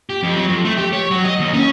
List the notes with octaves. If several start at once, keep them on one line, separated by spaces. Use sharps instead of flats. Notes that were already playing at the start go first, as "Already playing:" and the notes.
G4
F2
F#3
F2
A3
G4
C#5
F#3
D#5
D#2
C#4